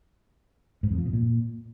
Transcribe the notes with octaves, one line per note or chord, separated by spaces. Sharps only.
G#2
F2
F3
B2
A#2